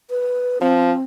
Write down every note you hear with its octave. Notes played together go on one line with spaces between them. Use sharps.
B4
F3 C4